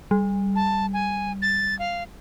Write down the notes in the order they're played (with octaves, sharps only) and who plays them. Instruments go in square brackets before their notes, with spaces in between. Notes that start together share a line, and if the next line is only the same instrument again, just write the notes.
[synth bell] G3
[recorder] A5
G#5
A6
F5